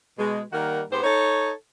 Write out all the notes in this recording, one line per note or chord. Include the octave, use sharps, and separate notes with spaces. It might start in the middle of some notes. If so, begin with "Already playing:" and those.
B2 G#3
D#3 G3 A#3 A#4 F#5
G#2 B3 G4 C5
D#4 A4 C#5